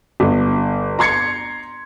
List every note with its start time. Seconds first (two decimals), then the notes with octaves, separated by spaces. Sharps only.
0.20 G1
0.99 A#5 C6 G#6 C#7